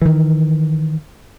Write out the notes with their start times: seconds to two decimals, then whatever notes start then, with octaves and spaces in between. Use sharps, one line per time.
0.02 D#3 E3